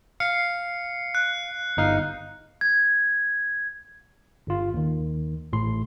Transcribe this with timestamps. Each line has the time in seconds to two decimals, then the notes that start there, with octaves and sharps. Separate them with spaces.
0.20 F5 C7 C#7
1.15 F#6
1.77 G1 D#4 F5
2.61 G#6
4.47 G1 F4
4.74 D#2 D#3
5.53 A1 A2 C6